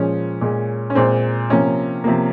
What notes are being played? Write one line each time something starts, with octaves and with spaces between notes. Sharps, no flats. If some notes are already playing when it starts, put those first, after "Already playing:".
Already playing: A#2 F3 G#3 C#4
A#2 G#3
C#4
A#2 G#3 C4
C3 F3 A#3 C#4
C3 F3 A#3